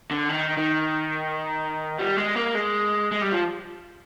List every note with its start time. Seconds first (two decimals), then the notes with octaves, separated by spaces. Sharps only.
0.11 D3
0.29 D#3
0.57 D#3
1.99 G3
2.17 G#3
2.36 A#3
2.56 G#3
3.12 G#3
3.21 G3
3.32 F3